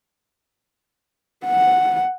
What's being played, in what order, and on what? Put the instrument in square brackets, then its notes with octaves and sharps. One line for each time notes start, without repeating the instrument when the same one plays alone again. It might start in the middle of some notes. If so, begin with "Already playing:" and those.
[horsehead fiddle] F#5